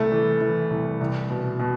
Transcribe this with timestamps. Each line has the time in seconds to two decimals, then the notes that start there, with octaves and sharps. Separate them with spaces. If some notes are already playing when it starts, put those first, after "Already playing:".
Already playing: C2 A3
0.12 E3
0.41 E3
0.70 C2
1.01 C2
1.30 B2
1.59 B2